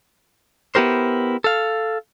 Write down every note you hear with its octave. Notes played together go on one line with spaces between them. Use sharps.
B3 E4 G4 A#4 C5
A4 F5